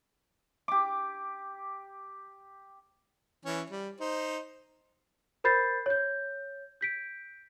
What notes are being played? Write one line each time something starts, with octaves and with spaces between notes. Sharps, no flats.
G4 D6
E3 C#4
G3
D#4 C5
A#4 C5 B5 G6 A6 C7
C#5 G6
G6 B6 D7